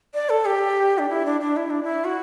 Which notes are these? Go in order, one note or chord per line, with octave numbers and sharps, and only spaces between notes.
D5
A4
G4
D4
E4
D4
D4
E4
D4
E4
F#4